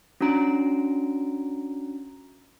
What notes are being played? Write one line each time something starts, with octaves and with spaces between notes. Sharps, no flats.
C#4 D4 F#4 A#5 D7